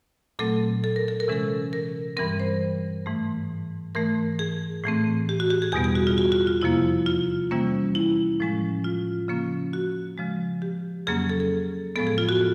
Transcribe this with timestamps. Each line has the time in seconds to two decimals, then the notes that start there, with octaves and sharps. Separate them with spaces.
0.39 A#2 F#3 A3 C4 A4
0.84 A4
0.96 A#4
1.08 A4
1.20 A#4
1.28 C3 E3 G#3 C#4 A4
1.73 A#4
2.17 G2 E3 G3 C4 A#4
2.40 C5
3.06 G#2 E3 A3
3.95 G#2 E3 A3 A#4
4.39 G#4
4.84 A2 E3 A3 C4
5.29 G4
5.40 F#4
5.50 G4
5.62 G#4
5.72 E2 B2 G3 B3 G#4
5.84 G#4
5.95 F#4
6.07 F4
6.18 F#4
6.32 F#4
6.47 F4
6.62 F2 C3 F3 A#3 E4
7.06 F4
7.51 C3 E3 G3 A#3 C#4
7.95 E4
8.40 A2 F3 G#3 C#4
8.84 F4
9.28 C#3 F3 A#3 C#4
9.73 F#4
10.18 C#3 F3 G#3
10.62 G4
11.07 F2 C#3 F#3 A#3 C#4 G#4
11.29 A4
11.40 A4
11.96 A2 F3 G#3 B3 A4
12.07 G#4
12.18 F4
12.29 F#4